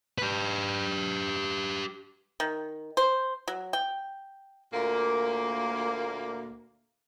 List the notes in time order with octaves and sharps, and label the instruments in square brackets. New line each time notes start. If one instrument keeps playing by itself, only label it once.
[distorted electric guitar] G4 B4
[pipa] D#3
C5
F#3
G5
[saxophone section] D2 A#2 A#3